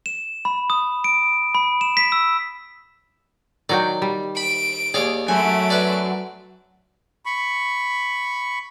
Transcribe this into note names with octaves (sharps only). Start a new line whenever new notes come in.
E7
B5
D#6
D7
B5
E7
B6
E6
D#3 F#3 D5 G5
G3
B5 D7
D#2 G#4 C#5 D5
F#2 A3 G#5 D7
B4 D5
B5 C#6